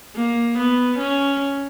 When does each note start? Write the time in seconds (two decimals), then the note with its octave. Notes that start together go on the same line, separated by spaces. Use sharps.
0.15 A#3
0.58 B3
0.98 C#4